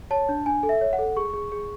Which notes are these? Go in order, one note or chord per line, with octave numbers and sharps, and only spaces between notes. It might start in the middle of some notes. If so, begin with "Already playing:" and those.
C#5 A5
D4
D4 G#5
A4
E5
C#5
F#5
A4
G#4 C#6
G#4
G#4